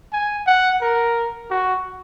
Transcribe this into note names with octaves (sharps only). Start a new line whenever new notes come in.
G#5
F#5
A#4
F#4